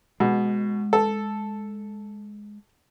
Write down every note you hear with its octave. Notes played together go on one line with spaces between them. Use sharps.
B2 G#3
A4